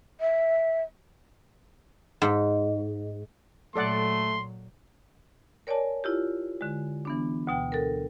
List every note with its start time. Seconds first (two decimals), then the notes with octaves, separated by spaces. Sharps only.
0.21 E5
2.22 G#2
3.76 A#2 F#3 A3 A4 D5 F#5 C6
5.67 A#4 C#5 D5 G#5 A5
6.04 E4 F4 G4
6.61 D3 G#3
7.05 E3 B3 D4
7.47 D2 B2 G5
7.72 A4 A#4